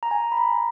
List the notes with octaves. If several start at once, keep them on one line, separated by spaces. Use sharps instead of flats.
A#5
G#5
B5
A#5